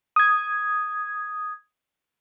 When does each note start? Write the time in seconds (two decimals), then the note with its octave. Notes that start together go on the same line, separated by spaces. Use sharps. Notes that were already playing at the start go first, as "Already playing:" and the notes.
0.16 D#6 G#6